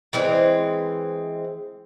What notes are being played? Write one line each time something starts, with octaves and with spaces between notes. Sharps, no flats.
E3 G#3 C4